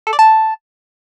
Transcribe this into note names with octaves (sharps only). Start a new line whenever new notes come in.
A4
D5
A5